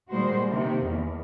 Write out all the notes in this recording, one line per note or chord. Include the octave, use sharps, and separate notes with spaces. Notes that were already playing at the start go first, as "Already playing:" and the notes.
A#2 D#3 G3 G#3 F#4 C5
C3 D#3 A#3
E2